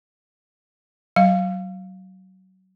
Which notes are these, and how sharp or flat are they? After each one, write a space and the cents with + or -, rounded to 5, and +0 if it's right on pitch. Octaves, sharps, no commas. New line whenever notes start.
F#3 +25 F5 +0